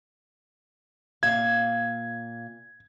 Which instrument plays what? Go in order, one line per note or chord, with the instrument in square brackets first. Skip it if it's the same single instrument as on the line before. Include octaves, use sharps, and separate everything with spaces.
[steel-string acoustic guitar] A#2 F5 [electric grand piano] G#6